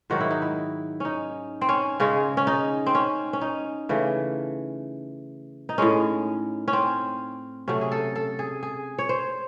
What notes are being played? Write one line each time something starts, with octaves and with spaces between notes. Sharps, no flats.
G#2 D#3 F#3 F#4
E4
D#4
E4
C#4 D#4
C4
C#4
C#3 G#3 C#4
C#4
D#4
C4
C#4
C#4
D#4
C#3 E3 A3
D#4
A2 G#3 C#4
C#4
C4
C3 F#3 A3 C#4
G#4
A4
A4
G#4
G#4
C#5
C5